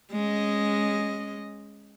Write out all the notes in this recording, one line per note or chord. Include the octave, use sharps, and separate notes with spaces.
G#3 C#4 D#5